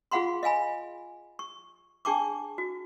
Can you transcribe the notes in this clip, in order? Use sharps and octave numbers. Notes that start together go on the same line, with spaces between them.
F4 G#4 F5 F#5 B5 C6
D#5 F5 G#5 B5
C#6
D4 G#4 G5 A5 C#6 D6
F#4